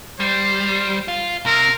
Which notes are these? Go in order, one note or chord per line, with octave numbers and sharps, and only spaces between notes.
G3 C5
F4
C3 A#4